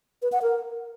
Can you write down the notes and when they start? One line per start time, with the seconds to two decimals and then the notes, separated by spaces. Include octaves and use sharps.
0.22 B4
0.32 F#5
0.42 A#4